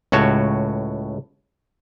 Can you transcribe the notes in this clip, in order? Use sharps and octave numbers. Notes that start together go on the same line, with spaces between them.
C#2 A2 F#4 C#5 A5